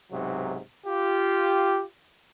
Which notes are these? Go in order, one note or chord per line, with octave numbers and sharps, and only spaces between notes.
B1 G#2 C3 F#3
F4 G4